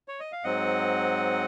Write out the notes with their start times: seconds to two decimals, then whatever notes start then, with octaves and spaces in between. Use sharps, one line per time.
0.08 C#5
0.20 D#5
0.32 F5
0.44 G#2 F#3 C4 D#5 F#5